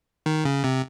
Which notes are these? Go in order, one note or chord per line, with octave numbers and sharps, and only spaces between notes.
D#3
C#3
C3